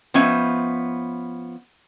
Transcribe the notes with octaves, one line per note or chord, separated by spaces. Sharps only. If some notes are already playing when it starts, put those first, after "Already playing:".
F3 B3 C#4 D#4 E5